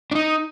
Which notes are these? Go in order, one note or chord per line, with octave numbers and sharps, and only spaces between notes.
D4
D#4